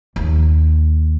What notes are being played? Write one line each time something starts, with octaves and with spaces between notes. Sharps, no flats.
D#2